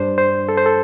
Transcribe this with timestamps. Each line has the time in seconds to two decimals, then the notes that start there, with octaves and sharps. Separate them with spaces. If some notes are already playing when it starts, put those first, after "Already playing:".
Already playing: G2 G3 D4 C5
0.18 C5
0.49 A4
0.57 C5
0.66 A4